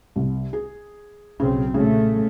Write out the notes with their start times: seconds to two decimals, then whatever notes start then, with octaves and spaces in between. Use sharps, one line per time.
0.16 C2
0.53 G#4
1.40 B1 C#3 C4
1.74 A#2 C#3 A3